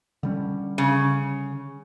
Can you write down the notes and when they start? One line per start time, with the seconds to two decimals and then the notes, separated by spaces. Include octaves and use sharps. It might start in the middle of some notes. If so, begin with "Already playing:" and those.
0.23 D3 G3 C#4
0.78 C#3